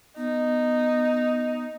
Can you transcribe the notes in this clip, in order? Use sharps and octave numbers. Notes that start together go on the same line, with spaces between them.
B3 D#4